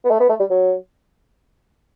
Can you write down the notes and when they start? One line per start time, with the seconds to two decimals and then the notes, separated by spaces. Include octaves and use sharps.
0.05 B3
0.10 A3
0.20 B3
0.29 A3
0.40 G3
0.50 F#3